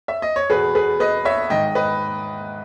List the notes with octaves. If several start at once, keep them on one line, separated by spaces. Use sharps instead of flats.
E5
D#5
C#5
E2 B2 G#4 B4
G#4 B4
B4 D#5
C#5 E5
G#2 D#3 D#5 G5
B4 D#5